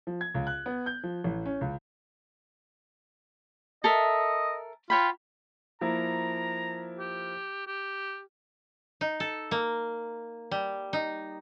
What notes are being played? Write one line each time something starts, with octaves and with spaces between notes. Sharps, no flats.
F3
G#6
C#2
F#6
B3
G6
F3
A1
C#4
C#2
A4 A#4 D#5 E5
F4 C#5 G5 B5
F3 A#3 E4 A#5
G4
G4
D#4
A4
A#3
G3
D#4